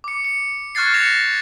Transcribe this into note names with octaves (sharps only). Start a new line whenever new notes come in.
D6 C#7
C#7
C#6 F6 F#6 G#6 A6 C7
A#6 C#7 E7 F7